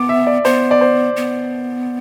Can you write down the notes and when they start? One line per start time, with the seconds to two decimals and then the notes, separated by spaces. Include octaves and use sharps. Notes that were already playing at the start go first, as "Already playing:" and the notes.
Already playing: B3 D6
0.09 E5
0.27 D5
0.45 B3 C5
0.71 D5
0.81 C5
1.16 B3